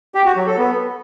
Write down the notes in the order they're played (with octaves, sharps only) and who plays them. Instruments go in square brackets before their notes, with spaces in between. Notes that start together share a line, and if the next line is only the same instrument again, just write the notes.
[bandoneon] G4
F#4
F#3
A4
B3